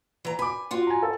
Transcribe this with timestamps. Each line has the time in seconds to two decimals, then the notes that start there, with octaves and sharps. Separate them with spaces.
0.25 E3 A#5
0.39 G#5 B5 D6
0.71 F4 F#4
0.87 G#5 A#5
1.03 A4